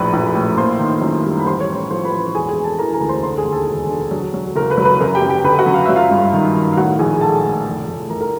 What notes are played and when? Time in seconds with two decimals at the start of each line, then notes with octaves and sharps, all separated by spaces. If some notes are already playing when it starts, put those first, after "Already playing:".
Already playing: A#1 F#2 A2 B4 B5
0.13 A#1
0.35 A2
0.57 A#3 C5 C6
0.79 D#3
1.02 F#2
1.24 G3
1.40 B5
1.46 A1 C5 C6
1.60 C#5 C#6
1.69 A1
1.90 F3 C5 C6
2.05 B4 B5
2.12 A1
2.35 E1 G#4 G#5
2.49 G#4 G#5
2.57 E1
2.64 A4 A5
2.79 E3 A#4 A#5
2.93 A#4 A#5
3.00 D2
3.09 C5 C6
3.23 D3 C5 C6
3.38 G#4 G#5
3.45 D#2
3.52 A4 A5
3.67 E1
3.90 D3
4.11 F#3
4.34 F#3
4.56 F#1 A#4 A#5
4.70 B4 B5
4.78 F#3
4.85 B4 B5
5.00 F#2 A#4 A#5
5.15 G4 G5
5.22 F#2
5.29 G4 G5
5.44 D3 B4 B5
5.59 F#4 F#5
5.66 F#2
5.74 F5
5.85 F#3 E5
5.96 F4 F5
6.11 G2
6.33 D#3
6.55 D#3
6.73 F5
6.77 A2 F#4 F#5
6.99 A#1 G#4 G#5
7.21 G#3 A4 A5
7.44 A2
7.66 F1
7.88 F1
8.10 F1 A#4 A#5
8.21 A#4 A#5